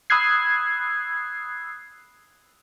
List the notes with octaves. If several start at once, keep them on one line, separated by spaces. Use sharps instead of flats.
B5 D#6 E6 F#6 G#6 C7